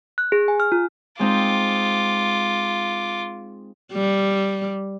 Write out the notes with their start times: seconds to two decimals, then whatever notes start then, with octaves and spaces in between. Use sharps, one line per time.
0.18 F#6
0.32 G#4
0.48 G#5
0.60 F6
0.72 F4
1.19 G#3 C4 D#4 F4 D6
3.92 G3